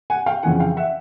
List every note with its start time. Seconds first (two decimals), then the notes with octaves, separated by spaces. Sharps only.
0.10 F#5 G#5
0.26 F5 G5
0.43 F2 C#3 E3 F#5 G#5
0.59 F5 G5
0.77 E5 F#5